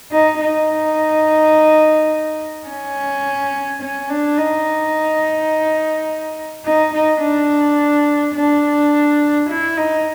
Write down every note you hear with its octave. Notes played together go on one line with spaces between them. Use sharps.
D#4
D#4
C#4
C#4
D4
D#4
D#4
D#4
D4
D4
E4
D#4